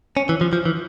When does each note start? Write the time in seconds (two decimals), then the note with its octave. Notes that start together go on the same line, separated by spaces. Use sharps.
0.17 C#4
0.29 E3
0.41 F3
0.53 F3
0.66 E3